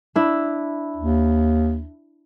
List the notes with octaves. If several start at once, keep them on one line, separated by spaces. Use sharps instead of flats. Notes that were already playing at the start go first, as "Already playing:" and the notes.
D4 E4
D#2